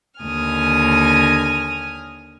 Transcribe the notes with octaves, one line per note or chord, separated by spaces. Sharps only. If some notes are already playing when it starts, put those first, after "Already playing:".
D#2 D3 G#5 D#6 F6